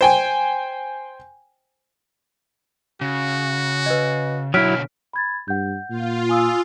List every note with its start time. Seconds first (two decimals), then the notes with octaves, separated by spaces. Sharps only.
0.01 C5 G5 G#5
3.01 C#3 F#4
3.86 B4 D#5
4.54 B2 D3 F#3 E4 C#5 F6 B6 D7
5.13 B5 G#6 A6
5.48 G2 F#5 G6
5.90 A#2 F4
6.29 G#5 D#6 E6